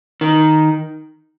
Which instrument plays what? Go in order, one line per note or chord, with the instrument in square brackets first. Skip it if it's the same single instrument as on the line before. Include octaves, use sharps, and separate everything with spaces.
[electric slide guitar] D#3